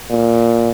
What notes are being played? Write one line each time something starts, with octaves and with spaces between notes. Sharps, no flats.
A#2